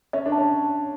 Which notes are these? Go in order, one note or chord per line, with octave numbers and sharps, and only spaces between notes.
C#4 E5
D4
A5
C#4